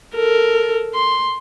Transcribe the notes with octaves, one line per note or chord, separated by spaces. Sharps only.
A4 A#4
C6